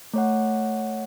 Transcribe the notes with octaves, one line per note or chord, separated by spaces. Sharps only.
A3 C#5 F#5